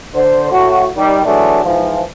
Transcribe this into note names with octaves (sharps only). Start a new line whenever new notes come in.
D3 C5
A2 F#4
D#3 G3
E3 F#3 G#3 A3 D4
G#2 E3 F3